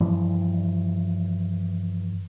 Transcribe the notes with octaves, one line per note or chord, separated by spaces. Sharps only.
G2 E3 F3